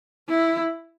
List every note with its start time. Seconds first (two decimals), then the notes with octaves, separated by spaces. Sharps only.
0.29 E4